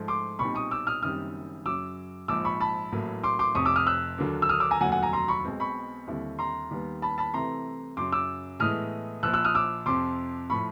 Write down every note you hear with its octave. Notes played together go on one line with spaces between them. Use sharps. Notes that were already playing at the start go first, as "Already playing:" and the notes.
Already playing: G#2 F3 A3
C6 D6
B1 A#2 G3 C4 D#4 B5 C#6
C#6 D#6
D6 E6
D#6 F6
F#1 F#2 D#3 G3 C4 D#6 F6
F#2 C#3 F#3 D6 E6
A#1 G#2 F3 D6 E6
B5 C#6
A5 B5
A1 A2 F#3 A#3
C6 D6
C6 D6
F1 F2 C3 C#6 D#6
D6 E6
D#6 F6
E6 F#6
D#2 D3 F#3 A#3 D4
E6
D#6 F6
D6 E6
G#5 A#5
F1 D#2 D3 F#3 F#5 G#5
F#5 G#5
G#5 A#5
A#5 C6
B5 C#6
B1 B2 G#3 C4
B5 C#6
D#2 D3 G3 C4 E4
A#5 C6
D#2 D#3 G3 B3
A5 B5
A5 B5
C2 C3 E3 A3 A#5 C6
F#2 C#3 F#3 C6 D6
D6 E6
A2 E3 G#3 B3 D#6 F6
A#1 A#2 F3 E6 F#6
E6 F#6
D#6 F6
D6 E6
F2 C3 F3 C6 D6
A2 F3 B5 C#6